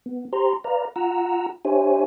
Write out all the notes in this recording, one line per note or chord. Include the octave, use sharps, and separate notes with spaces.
B3
G4 C5 A#5 C6
B4 D5 F5 A#5
F4 F#5 A#5 E6
D4 G4 C5 C#5 E5 G#5